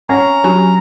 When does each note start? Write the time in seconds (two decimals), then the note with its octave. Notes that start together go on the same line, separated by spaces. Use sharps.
0.09 C#4 F#5 A#5
0.44 F#3 D4 G4 B5